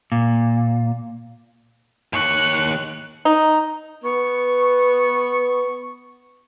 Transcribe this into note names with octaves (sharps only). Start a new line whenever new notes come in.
A#2
D#2 C#5 F#6
D#4
B3 C#6